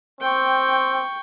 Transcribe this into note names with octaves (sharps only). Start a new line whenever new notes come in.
C4 G5 C#6